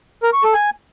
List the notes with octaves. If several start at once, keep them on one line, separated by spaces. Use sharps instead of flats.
A#4
C#6
A4
G#5